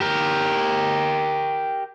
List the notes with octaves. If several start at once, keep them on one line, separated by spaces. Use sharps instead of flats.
G4 A#4